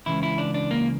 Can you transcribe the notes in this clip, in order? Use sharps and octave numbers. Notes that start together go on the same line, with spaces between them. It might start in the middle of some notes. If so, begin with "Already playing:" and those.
C#2 C#3 E3 E4
E4
D4
D4
A#3